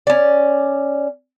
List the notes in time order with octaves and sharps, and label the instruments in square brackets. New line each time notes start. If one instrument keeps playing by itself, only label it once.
[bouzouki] C#4 D5